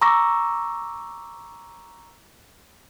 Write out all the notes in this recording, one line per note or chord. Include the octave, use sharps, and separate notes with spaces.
A#5 C#6 D6 E6 A#6